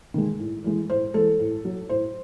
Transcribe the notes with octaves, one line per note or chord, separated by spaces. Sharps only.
D#3 G#3
A2
E3 G#3
A2 C5
E3 G#3 A4
A2
F#3
A2 C5